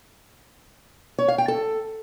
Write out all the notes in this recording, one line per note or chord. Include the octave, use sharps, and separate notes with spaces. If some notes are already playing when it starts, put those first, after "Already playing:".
C#5
F5
G5
A4